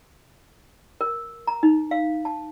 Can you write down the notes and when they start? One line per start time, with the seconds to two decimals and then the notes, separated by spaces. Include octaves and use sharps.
1.01 A#4
1.47 A#5
1.63 D#4
1.91 F5
2.25 A5